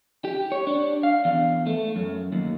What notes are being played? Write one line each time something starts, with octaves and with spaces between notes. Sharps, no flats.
G4
C#5
D4
F5
E2
A3
F#2
D#2